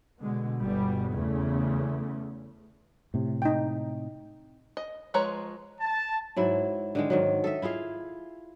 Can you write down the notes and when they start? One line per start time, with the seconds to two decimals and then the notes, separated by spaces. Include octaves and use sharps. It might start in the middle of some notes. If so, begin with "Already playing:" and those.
0.18 B2 D3 G#3
0.59 G1 B2 G3 B3
1.10 E2 C#3 A3
3.14 A2 C3
3.42 D#4 G5
4.77 D#5
5.14 F3 G#3 B4 C#5 A#5
5.80 A5
6.36 G#2 F#3 E4
6.95 D3 D#3 G#3
7.10 G#2 D#3 F#3
7.44 A4 D#5 E5
7.62 E4 F4 G#4 F5